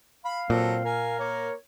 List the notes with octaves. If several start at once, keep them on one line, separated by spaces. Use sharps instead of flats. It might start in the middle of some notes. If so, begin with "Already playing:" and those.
F5 B5
A#2 F#3 C4 A4
A#4 G#5
A#3 C#5